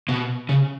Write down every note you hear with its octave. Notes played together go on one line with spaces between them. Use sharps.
B2
C#3